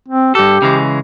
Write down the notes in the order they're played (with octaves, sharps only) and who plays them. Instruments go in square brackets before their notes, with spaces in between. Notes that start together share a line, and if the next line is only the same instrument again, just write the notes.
[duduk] C4
[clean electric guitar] G2 A4 [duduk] G4
[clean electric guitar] C#3 E3 G#3